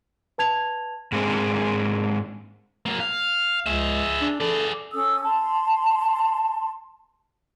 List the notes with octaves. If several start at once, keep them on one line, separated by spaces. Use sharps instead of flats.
B4 A5 G#6 F7
G#2 G#3 A#3 C4 D4 G#4
F#3 A#3
F5
C#2 G#4 E5
D4
G#4 A4 D5
C#4 A4 D#6 E6
A5 C6